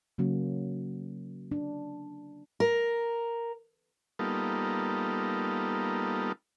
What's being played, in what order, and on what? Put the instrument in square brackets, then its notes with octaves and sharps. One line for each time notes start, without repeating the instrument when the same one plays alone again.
[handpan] C#3 F#3 A#3 C#4 F#4
D4
[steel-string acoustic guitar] A#4
[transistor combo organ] G3 A#3 B3 D#4 F4 A4